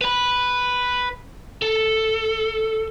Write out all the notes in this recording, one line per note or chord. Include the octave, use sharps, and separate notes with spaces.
B4 B5
A4